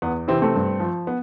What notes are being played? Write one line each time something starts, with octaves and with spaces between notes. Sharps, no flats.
E2 B3
C3 E3 C4 E4
A3 C4
G2
F3
B3